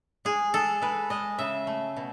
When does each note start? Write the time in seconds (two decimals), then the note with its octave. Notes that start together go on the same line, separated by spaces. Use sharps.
0.25 G#3 G#4
0.54 G#3 A4
0.82 G#3 B4
1.10 G#3 D#5
1.39 C#3 E5
1.67 A3
1.96 B2